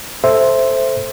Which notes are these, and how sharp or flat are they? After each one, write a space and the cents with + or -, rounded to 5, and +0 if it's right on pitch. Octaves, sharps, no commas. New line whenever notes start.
A4 +0 C5 +0 E5 +0